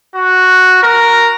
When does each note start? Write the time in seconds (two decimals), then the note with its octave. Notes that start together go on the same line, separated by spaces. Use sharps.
0.16 F#4
0.83 A#4